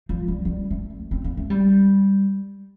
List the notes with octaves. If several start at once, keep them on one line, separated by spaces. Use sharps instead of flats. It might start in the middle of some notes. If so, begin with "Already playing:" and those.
F3
G3
G3
A3
C4
A#3
A3
G3